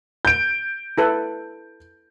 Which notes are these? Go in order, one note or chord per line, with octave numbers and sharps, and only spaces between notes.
G6 D7
E4 A4 B4